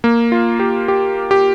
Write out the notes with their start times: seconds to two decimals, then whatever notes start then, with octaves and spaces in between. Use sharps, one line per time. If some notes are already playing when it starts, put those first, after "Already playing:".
0.04 A#3
0.32 F4
0.60 G4
0.88 G4
1.31 G4